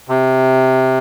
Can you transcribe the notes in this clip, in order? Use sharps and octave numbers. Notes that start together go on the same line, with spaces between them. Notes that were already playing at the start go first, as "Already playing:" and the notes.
C3